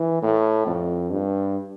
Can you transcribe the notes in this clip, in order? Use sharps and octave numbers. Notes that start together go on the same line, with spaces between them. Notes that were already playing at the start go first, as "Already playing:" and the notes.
Already playing: E3
A2
F2
G2